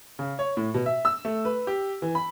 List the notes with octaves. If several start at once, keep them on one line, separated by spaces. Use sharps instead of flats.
C#3
C#5
A2
B2
E5
E6
A3
B4
G4
E3
B5